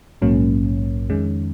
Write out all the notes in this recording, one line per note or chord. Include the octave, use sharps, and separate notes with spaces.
A#1 G#2 F#3 A#3 C#4
F2 D#3 G#3 C#4